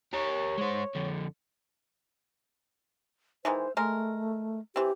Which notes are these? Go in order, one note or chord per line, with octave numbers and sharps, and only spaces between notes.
G4 A#4 C#5
G#3 C5
F2 D3
D#3 E3 G#3 C5
G#3 A3 A#4
E3 C4 G4